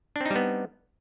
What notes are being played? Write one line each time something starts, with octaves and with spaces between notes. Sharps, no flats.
G3 B3 C4 D4 D#4